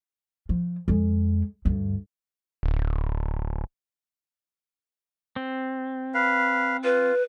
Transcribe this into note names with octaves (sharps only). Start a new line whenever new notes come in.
F3
F2 G#3
D2 G2
D1
C4
B4 F5
F4 B4